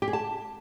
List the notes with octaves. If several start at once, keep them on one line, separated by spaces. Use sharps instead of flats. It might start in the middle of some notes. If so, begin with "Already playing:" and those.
G4
G#4
A5